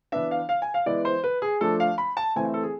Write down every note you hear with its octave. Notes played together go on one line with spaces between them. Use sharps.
E3 B3 D4 E5
F5
F5
G#5
F5
E3 G#3 B3 E4 D5
C5
B4
G#4
F3 A3 D4 A4
F5
B5
A5
E3 A3 C4 E4 G#5
E5
A4
G#4